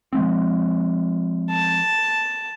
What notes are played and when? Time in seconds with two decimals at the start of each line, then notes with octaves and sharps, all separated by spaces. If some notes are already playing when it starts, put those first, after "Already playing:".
0.13 F3 G#3 C4
1.51 A5